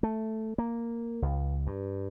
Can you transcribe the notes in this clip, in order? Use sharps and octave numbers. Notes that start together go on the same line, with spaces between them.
A3
A#3
C#2
G2